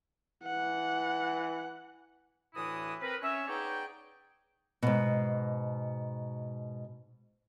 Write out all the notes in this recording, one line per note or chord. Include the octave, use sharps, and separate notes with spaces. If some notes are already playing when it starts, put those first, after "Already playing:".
E3 F#5
D2 A2 E3 E4 F#4 D#6
C4 A#4 B4
C#4 C#5 E5
B3 D#4 G#4 C#5 D5 G5
G#2 B2